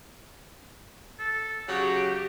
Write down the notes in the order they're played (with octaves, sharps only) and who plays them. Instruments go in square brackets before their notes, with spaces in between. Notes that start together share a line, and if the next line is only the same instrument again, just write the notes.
[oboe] A4
[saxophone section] C#3 F#3 [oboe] D#4 [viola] G4